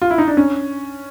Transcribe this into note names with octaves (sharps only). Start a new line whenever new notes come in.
F4
E4
D#4
D4
C#4